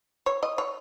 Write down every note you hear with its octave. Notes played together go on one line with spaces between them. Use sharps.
C#5
D#5
C#5